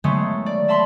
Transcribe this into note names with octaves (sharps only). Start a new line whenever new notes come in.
D#3 F#3 G#3 A3 B3
D5
E5 A5 B5 C6